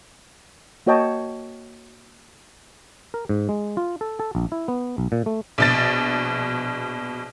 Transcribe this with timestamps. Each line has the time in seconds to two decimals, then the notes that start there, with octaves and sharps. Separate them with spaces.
0.86 A#3 F#4 C#5 D#5 G5 A5
3.14 A#4
3.29 G#2
3.49 G#3
3.77 F4
4.01 A4
4.20 A4
4.35 A#1
4.52 E4
4.68 B3
4.98 B1
5.12 A#2
5.26 A3
5.58 A#1 B2 A6